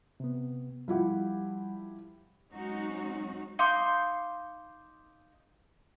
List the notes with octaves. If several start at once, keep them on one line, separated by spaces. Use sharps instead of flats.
C3 B3
F3 G3 E4 G4 F#5
F#3 G#3 C4 C#4 D#4 F#4
D#4 F5 C6 D6